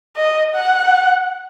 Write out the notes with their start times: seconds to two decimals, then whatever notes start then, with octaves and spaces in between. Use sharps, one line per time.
0.16 D#5
0.55 F#5